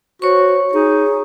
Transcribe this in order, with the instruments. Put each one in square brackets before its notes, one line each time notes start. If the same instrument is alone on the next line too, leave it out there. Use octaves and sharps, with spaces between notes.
[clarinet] F#4 [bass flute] C5 [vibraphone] C#5 C#6
[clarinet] D#4 [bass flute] G#4